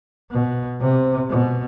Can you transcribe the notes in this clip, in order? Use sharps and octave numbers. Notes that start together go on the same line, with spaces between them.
B2
C3
B2